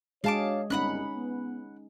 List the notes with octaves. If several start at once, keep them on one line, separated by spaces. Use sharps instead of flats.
G#3 D4 F#4 G#4 C#5 F5 A5 D6
G1 C2 C#4 D#4 F#5 B5 F#6
B3